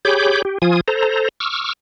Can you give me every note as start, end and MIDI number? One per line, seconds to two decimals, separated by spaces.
0.05 0.42 67
0.05 0.42 68
0.05 0.42 73
0.05 0.42 83
0.05 0.42 86
0.05 0.42 91
0.45 0.58 67
0.62 0.81 53
0.62 0.81 65
0.62 0.81 80
0.62 0.81 87
0.88 1.29 69
0.88 1.29 72
0.88 1.29 82
1.40 1.73 85
1.40 1.73 86
1.40 1.73 88
1.40 1.73 89